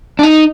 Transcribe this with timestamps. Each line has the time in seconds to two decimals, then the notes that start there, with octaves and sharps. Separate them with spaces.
0.19 D4
0.23 D#4